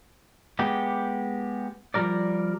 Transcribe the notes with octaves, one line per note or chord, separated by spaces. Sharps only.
G#3 B3 G4
F3 G3 A#4 D5